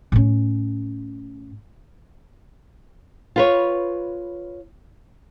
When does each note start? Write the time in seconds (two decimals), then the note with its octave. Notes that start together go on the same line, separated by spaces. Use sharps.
0.12 A2 C#4
3.36 F4 B4 C#5